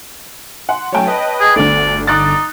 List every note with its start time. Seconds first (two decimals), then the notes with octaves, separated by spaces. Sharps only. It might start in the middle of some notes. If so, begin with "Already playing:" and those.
0.69 F#5 C6
0.92 F#3 A3 C#4 C#5 G5 A5
1.07 B4 D#5
1.40 G#4
1.56 G1 D2 D3 A3 D5
2.07 D#4 D6 F#6 A6